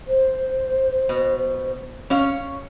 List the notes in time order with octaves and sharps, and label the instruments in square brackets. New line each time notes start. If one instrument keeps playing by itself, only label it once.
[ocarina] C5
[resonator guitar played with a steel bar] B2
C#4 C#5 F5